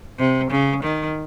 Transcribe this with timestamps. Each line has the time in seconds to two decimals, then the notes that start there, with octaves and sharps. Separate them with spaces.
0.18 C3
0.51 C#3
0.83 D#3